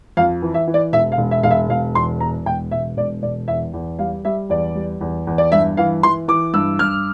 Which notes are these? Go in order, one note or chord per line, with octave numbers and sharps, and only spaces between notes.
F2 F5
E3
E5
E3
D5
E1 E5
F5
E1
E5
E1 F5
E5
E1 F5
E2 C6
E2 A#5
E1 G5
E1 E5
E1 D5
E1 D5
E2 E5
E2
G3 F5
G3 E5
E2 D5
G3
E2
E2
D5
G2 E5
E3 F5
E3 C6
E3 D6
G2 E6
G2 F6